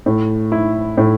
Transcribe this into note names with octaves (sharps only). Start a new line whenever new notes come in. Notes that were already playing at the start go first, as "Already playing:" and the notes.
A2
E4
A2